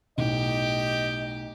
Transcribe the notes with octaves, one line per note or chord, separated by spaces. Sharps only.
B1 A2 G4 D#5